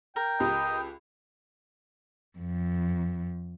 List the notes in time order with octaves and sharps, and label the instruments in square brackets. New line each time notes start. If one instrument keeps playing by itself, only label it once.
[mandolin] A#4 [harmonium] G5
[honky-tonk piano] C#2 G4 [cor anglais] D#5
[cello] F2